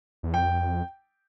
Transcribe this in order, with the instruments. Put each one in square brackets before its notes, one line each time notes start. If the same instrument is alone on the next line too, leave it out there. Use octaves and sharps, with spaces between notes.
[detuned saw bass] E2
[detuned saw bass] F2 [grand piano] G5